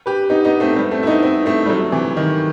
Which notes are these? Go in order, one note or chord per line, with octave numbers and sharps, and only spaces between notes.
G4 B4
B3 D#4
B3 D#4
A3 C4
G3 B3
A3 C4
E4
B3 D#4
C4 E4
A3 C4
G3
F#3 A3
C3 E3
D#3